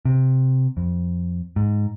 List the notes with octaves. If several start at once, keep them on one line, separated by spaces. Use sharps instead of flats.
C3
F2
G#2